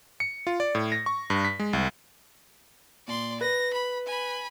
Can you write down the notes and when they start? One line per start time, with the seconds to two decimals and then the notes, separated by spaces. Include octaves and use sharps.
0.20 C#7
0.47 F4
0.60 D5
0.75 A2
0.92 A#6
1.06 C#6
1.30 G2
1.45 B6
1.60 G#3
1.73 C2
3.08 A#2 D5 C6
3.41 B4 A#6
3.74 B5
4.06 G#5 B5